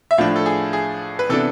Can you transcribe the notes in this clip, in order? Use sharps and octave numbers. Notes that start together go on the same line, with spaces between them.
E5
A2 F3 A3 D4 F5
A4
G#4
G#4
B4
C3 E3 B3 D4 A4